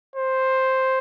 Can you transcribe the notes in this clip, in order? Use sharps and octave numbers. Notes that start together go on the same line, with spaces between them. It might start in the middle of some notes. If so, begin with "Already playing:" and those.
C5